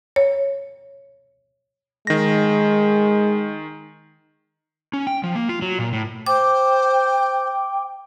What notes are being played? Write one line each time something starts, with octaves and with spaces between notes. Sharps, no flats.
C#5
D#3 G#3 A#6
C#4
G5
F3
A#3
F4
F#3
A#2
A2
C5 G5 D6